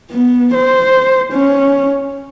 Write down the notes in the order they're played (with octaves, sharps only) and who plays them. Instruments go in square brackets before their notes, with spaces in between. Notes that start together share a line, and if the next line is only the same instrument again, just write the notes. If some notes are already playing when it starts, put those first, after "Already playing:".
[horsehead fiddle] B3
C5
C#4